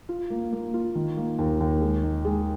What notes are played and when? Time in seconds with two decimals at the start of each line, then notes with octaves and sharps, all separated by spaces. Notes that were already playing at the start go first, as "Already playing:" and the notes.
0.09 F4
0.30 A#3
0.52 A#3
0.74 F4
0.95 D#3
1.17 A#3
1.39 D#2
1.60 D#2
1.82 G#3
2.03 D#3
2.25 G#3